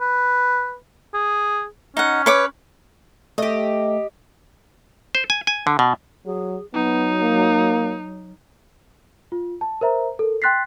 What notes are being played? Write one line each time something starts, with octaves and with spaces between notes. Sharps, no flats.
B4
G#4
C#4 D#4 F#5
B4 C#5 D6
A3 G4 D#5
C5
G#5
G#5
D3
B2
F#3 G#4
F#3 B3 D#4
A#3
F4
A5
A#4 C5 E5 A#5
A4 A#4
G5 C6 F#6 A6 B6 C7